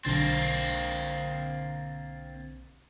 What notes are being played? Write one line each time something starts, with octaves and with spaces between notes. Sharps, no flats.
B1 D3 A#3 C4 A6